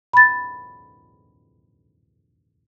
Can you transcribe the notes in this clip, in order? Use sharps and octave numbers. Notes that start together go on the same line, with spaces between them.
B5 A6